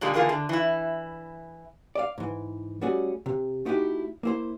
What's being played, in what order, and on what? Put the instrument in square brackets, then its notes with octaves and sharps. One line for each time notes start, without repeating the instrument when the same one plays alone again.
[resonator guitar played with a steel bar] A#2 D3 G3 G#3
D3 E3 A#3 F4 G#4
D3
E3 E4
[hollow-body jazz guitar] D5 D#5 F5
G#2 E3
G3 A3 C#4 F#4 G#4
C3
A3 D#4 E4 F#4 G4
A#3 E4 C5